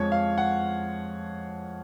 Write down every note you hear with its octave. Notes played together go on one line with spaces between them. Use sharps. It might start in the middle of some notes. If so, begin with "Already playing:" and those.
Already playing: F2 F3 G#3 C#5
F5
F#5